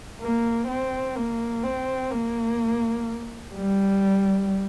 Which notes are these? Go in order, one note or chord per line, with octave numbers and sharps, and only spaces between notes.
A#3
C4
A#3
C4
A#3
G3